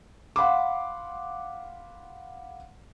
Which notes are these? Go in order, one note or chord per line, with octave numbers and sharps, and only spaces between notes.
F5 F#5 B5 C6 D6